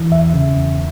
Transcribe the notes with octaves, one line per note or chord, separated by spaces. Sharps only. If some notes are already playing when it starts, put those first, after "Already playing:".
Already playing: E3
E2 E5
C#3
E2